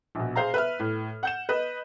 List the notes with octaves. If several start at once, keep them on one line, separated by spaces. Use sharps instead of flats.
A#1 B2
G#4 C5 F5 A#5
B4 E5 F6
A2
F#5 G6 E7
B4 D#5